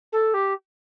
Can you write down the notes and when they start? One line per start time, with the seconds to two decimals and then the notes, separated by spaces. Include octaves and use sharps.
0.12 A4
0.34 G4